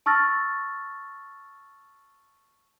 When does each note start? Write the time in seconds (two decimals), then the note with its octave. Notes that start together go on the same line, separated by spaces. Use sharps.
0.06 A5 C#6 E6 F6 A6 A#6